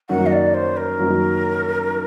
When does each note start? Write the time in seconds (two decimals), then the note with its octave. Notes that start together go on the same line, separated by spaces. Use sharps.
0.09 F#2 D#3 F#3 A#3 F#5
0.26 D#5
0.32 D5
0.54 C5
0.76 A#4
0.99 F#2 D#3 F#3 A#3